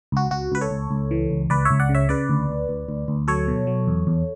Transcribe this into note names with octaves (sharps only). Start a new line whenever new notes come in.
C#2 F#4
C#2 F#4
C#2 B4
A4 C#5
C#2
C#2
E3
C#2
C#2 B4 D5
C#5 E5
C#2
D5 F#5
C#3
C#5 E5
C#3 B4 D5
D2
D2
D2
D2
D2
F#3 A4 C#5
B2
F#3
E2
E2